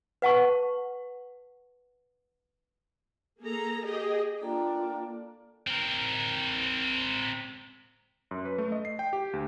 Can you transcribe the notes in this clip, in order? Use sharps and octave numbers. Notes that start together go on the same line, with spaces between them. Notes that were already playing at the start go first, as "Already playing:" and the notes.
B4 F#5 A5 C#6
A#3 G#4 A4 A#5
G4 G#4 D#5
A#3 D4 F4 A4 G5 A#5
C4 A#4
F#2
B4
A3
D#5
C7
G5
G4
D2